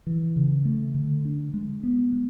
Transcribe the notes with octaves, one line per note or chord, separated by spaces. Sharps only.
E3
C#3
A3
D3
D4
G#3
B3
G#3